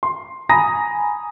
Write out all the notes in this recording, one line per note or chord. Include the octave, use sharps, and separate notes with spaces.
C6
G#5 A#5 B5 D#6 A#6